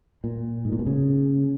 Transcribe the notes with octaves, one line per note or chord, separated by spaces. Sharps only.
A#2
G#2
A#2
B2
C#3